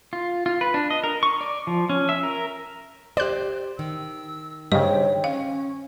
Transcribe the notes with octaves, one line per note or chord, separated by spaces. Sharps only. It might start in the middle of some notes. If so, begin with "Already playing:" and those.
F4
F4
B4
D4
D#5
A#4
C#6
D5
F3
C#4
E5
A#4
G4 C5 D5 F#6
D#3 E6
G2 C#3 C5 C#5 D#5 G5
C#4 F5